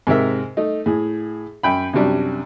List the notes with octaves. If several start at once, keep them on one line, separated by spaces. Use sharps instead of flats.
G#2 C3 A#4 E5
A3 D#4
A2 G#4
F#2 G5 B5
F#2 C3 F#3 G3 D4